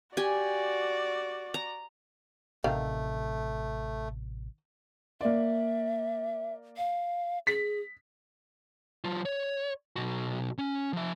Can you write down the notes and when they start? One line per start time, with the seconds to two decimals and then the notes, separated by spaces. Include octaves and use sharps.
0.17 F#4 G4 D5 G#5
1.54 A#5
2.64 A1 C3 D#3 A3 F5
5.21 A#3 D5 E5
6.77 F5
7.47 G#4 B6
9.04 F#3 F4
9.25 C#5
9.96 B1 F#4
10.58 C#4
10.93 F3 E5